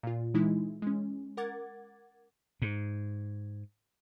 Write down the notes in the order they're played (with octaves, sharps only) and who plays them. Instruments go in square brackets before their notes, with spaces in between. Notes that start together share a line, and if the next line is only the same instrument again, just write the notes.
[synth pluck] A#2 F4
E3 G#3 D#4 E4
G#3 C#4
A#4 F#5 D6 G#6 A6
[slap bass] G#2